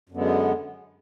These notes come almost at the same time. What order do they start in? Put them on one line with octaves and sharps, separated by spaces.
F#2 D3 B3 G#3